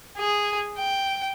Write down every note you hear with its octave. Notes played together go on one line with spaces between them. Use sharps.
G#4
G5